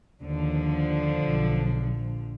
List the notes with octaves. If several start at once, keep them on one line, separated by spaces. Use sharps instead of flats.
D#2 D3 F3
B1
A#1